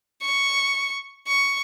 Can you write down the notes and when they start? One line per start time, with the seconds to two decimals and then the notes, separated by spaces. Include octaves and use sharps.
0.22 C#6
1.28 C#6